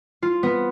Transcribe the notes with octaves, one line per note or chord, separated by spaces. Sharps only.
F4
B3